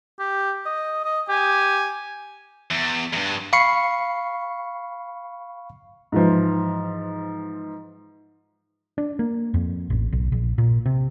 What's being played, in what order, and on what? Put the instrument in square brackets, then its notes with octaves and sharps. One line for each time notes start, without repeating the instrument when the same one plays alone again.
[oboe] G4
D#5
D#5
[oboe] G4 [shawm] G#5
[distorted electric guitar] E2
E2 G2
[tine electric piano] F5 B5 C#6 C7 C#7
[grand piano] G#2 E3 F3
[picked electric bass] D4
A#3
F2
A1
B1
A#1
A#2
C3